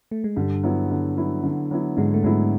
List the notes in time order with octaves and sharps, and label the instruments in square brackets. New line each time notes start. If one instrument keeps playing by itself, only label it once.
[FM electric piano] A3
G#3
[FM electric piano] G2 G3 [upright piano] D3
[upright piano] F#3 B3 E4
D3
F#3 B3 E4
D3
F#3 B3 E4
[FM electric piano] G#2 G#3 [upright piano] D3
[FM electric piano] A3
[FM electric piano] G#2 G#3 [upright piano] F#3 B3 E4